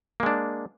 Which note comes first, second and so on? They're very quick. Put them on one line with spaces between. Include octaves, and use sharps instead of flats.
A#3 G#3 D4